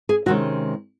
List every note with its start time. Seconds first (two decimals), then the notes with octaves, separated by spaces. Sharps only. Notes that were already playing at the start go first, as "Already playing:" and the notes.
0.09 G#4
0.26 C3 D#3 G#3 C#4 F#4